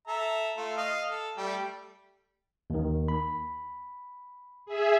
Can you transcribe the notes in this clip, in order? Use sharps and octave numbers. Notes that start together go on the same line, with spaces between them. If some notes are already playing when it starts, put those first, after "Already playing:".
A4 E5 A#5
A3 F4
D#5 F5
A4
G3 A3 G5
D#2 D#3
B5
G#4 E5